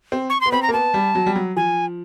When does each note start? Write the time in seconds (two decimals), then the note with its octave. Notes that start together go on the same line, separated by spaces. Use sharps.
0.12 C4
0.30 C#6
0.41 B3 C6
0.52 C4 B5
0.62 A#5
0.69 A#3
0.73 B3 A5
0.94 G3
1.15 F#3
1.26 G3
1.36 F#3
1.56 F3 G#5